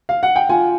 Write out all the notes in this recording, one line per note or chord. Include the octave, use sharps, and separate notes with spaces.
F5
F#5
G5
F4 G#5